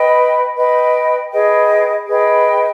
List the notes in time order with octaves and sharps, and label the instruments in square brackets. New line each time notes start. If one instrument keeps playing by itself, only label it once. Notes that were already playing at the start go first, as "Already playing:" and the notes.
Already playing: [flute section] B4 D#5 G5
B4 D#5 G5
G#4 B4 D#5 G5
G#4 B4 D#5 G5